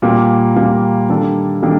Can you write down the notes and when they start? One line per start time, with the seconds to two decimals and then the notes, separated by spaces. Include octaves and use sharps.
0.02 A#2 G3 A#3
0.56 A#2 G3 A#3
1.09 D#3 G3 A#3 D4 A4
1.62 D#3 G3 A#3 D4 A4